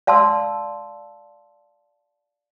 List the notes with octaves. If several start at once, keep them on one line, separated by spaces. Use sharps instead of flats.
D5 F5 A5 C6 E6